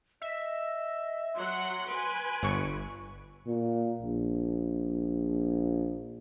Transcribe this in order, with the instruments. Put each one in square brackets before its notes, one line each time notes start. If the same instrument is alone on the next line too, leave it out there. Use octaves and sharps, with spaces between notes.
[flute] D#5 [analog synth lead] E5
[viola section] F#3 F#5 [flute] C6
[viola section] B4 G#5 [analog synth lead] D7
[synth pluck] G1 C#6
[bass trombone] A#2
A#1